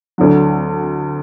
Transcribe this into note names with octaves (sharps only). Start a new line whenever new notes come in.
D2 D3 F#3